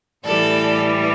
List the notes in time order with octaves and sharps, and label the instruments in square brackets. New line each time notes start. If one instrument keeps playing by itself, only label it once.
[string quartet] A2 E3 G3 A4 D5